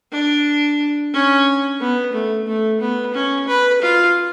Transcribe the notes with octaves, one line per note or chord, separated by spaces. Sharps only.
D4
C#4
B3
A3
A3
B3
C#4
B4
F4